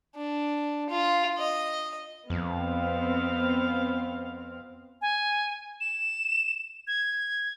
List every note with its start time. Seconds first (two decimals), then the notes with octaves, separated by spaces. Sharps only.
0.16 D4
0.90 F4
1.39 D#5
2.30 F2 B3 C4 F5
5.02 G#5
5.81 E7
6.87 G#6